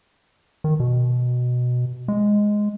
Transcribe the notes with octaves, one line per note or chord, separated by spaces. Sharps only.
D#3
B2
G#3